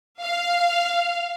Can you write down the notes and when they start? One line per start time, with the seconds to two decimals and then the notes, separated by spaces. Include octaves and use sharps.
0.21 F5